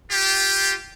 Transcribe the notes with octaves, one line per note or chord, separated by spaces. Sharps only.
F4 G4